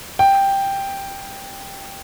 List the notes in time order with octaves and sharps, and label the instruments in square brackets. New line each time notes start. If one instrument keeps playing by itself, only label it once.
[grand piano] G5